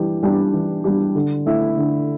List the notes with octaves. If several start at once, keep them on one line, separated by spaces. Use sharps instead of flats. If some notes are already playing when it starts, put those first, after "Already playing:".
Already playing: E3 G3 D4 G4
G3 D4 G4
E3
G3 D4 G4
D3
A3 E4
D3